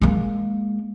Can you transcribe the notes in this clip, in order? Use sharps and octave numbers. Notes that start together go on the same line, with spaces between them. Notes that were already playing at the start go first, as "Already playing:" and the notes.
G#3 A#3